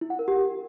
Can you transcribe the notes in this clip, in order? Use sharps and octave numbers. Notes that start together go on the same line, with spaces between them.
E4
F#5
A#4
G4